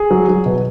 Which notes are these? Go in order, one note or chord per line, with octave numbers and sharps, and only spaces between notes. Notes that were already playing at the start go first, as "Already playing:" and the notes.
Already playing: G#4
F#3
F#3
B2